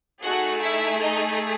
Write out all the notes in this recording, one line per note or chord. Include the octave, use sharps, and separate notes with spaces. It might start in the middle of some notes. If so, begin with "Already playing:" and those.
A3 D#4 F#4 G#4 F#5
E4 E5
D#4 D#5